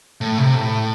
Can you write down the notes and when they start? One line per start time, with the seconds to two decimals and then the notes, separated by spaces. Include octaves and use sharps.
0.21 A2
0.38 C3
0.55 A2